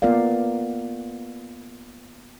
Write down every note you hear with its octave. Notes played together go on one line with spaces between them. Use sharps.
A#3 B3 F4 A#4 D5 F5